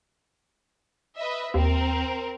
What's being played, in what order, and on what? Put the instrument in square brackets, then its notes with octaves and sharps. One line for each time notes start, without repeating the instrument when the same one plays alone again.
[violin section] B4 D#5 E5
[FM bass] D#2 [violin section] C4 A#4